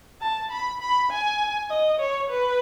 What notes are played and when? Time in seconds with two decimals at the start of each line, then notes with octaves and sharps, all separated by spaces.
0.21 A5
0.51 B5
0.80 B5
1.11 G#5
1.70 D#5
2.00 C#5
2.29 B4